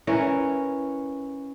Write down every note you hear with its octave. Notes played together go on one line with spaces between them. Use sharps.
E3 C#4 A#4